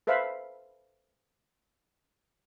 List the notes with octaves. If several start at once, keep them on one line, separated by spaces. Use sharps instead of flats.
A4 B4 C5 E5 F5 B5